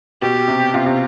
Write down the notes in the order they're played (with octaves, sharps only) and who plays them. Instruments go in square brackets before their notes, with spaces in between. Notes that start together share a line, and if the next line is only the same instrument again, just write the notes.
[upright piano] B2 [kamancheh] G4
[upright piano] C3
[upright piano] C3 [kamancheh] F4
[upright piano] C3